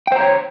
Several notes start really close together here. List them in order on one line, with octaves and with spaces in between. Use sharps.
G5 C5 A#5 C#5